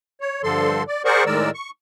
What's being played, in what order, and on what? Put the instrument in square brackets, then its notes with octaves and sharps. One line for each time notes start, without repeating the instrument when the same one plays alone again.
[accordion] C#5
G2 D3 F3 A4 C6
D5
G#4 A#4 C5 D5 F#5 C#6
A2 D#3 G#3 A#4 D5 E6
C#6